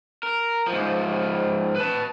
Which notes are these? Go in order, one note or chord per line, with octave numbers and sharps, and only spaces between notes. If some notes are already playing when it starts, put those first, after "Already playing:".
A#4
G#2 F3
B4 A5